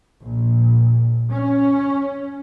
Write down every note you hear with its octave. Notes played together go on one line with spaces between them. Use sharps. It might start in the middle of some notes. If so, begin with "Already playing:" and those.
A#1
C#4